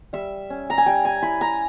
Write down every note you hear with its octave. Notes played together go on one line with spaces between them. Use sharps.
G3 E5
C#4
A#5
G#5
G3 G5
G#5
E4 B5
A#5